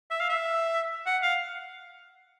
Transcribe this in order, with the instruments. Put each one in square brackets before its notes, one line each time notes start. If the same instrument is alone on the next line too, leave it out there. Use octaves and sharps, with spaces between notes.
[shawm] E5
F5
E5
F#5
F5